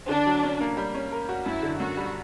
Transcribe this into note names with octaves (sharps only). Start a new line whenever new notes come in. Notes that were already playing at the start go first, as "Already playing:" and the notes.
D3 D4
F#3
C#4
A#3
G3
C#4
A#4
F#4
F#2 E4
D3
F#2 F#4
G3